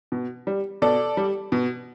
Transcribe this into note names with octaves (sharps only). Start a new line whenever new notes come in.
B2
G3
B2 A4 D5
G3
B2